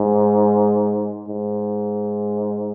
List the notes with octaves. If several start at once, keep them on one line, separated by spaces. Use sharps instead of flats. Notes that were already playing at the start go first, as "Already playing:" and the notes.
Already playing: G#2
G#2